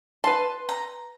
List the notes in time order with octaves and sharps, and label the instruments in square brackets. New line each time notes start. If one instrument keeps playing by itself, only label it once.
[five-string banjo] B4 A5 [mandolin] C6
[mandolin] A#5